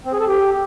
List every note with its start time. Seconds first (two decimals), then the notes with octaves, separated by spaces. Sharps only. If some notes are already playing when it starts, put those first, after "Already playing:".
0.05 C4
0.13 G#4
0.20 A4
0.27 G4